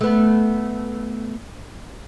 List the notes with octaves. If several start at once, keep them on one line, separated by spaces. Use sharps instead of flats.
A3 B3